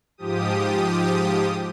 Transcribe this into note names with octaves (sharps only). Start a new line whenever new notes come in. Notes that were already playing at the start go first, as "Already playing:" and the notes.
G#2 F3 G4 D#6